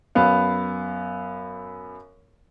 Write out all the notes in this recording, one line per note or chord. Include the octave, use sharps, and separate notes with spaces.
F#2 B3 F5